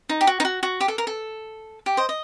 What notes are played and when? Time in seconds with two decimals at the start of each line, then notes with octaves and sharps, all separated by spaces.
0.09 D#4
0.21 G4
0.27 F#4
0.40 D#4
0.45 F#4
0.63 F#4
0.81 G4
0.88 A4
0.98 A#4
1.07 A4
1.86 G4
1.97 C5 D#5
2.09 D#5